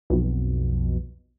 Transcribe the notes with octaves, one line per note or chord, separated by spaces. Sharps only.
B1 F2 B2